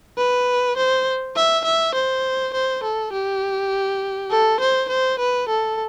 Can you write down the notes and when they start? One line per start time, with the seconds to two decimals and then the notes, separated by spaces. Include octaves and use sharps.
0.18 B4
0.77 C5
1.36 E5
1.65 E5
1.94 C5
2.54 C5
2.83 A4
3.13 G4
4.31 A4
4.60 C5
4.89 C5
5.19 B4
5.49 A4